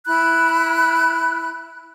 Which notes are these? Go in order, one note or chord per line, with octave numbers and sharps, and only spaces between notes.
E4 B5 F#6